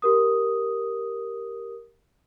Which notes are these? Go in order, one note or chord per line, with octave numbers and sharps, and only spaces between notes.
G4 A#4 D#6